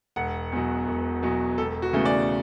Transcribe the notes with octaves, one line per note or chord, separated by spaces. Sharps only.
E1 F#5
E2 B2 F#3
E1
E2 B2 F#3
E1 A4
F#4
E2 C#3 E3 A3
D5